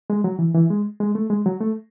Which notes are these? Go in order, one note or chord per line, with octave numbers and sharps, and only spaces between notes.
G#3
F#3
E3
E3
G#3
G#3
A3
G#3
F#3
A3